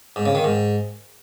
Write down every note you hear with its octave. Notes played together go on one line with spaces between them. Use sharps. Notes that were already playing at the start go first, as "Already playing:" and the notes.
G#2
C#3
D#3
G#2